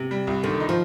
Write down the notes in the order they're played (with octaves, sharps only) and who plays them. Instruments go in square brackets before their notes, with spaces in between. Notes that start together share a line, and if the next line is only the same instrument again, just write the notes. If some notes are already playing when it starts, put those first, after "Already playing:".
Already playing: [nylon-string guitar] C3
[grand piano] G3
C2
[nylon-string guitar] D3 [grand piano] D#3
[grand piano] D#4
[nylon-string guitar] F3